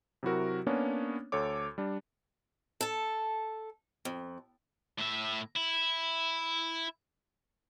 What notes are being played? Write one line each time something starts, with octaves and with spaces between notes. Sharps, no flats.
C3 F#3 E4 F#4 A#4
A#3 B3 C#4 D4 C#5
D2 A4 C#5 D6
G3 D4
A4 A5
F2
A2 E5
E4